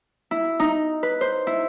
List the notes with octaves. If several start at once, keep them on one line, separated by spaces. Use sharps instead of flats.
E4
D#4
B4
C5
E4